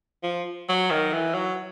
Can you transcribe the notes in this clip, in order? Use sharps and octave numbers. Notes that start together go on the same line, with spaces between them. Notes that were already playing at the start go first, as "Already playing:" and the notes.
F3
F#3
D#3
E3
F#3